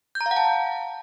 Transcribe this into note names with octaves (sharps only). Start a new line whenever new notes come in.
G6
A#5
F5
F#5
A5